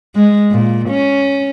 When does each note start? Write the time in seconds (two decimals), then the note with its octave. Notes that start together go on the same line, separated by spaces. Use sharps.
0.16 G#3
0.52 A#2
0.89 C#4